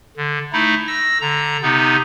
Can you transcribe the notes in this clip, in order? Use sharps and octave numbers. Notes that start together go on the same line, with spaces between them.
D3
A3 D#4 E4
E6 A#6
D3 A#5
C3 B3 D#4